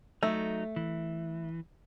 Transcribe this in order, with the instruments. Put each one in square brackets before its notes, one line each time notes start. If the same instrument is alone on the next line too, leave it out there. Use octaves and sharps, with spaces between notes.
[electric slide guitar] F#3 D#4 [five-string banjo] A3
[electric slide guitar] E3